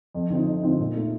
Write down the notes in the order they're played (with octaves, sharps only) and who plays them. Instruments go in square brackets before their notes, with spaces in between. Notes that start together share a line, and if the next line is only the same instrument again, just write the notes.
[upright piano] F2
D3 F3 C4 D#4
F2
D3 F3 C4 D#4
A#2
A3 D#4